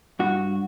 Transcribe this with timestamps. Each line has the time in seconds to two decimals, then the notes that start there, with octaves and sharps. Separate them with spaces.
0.19 G2 F#4